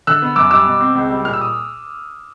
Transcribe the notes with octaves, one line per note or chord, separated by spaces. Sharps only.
D3 E6 F#6
B3
F#2 D6 E6
G3 D6 E6
B2
C4
C#2
G3
A#2 F6
E6
D#6